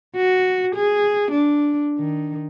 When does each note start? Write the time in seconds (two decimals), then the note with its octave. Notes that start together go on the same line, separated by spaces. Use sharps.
0.16 F#4
0.75 G#4
1.31 D4
1.99 D#3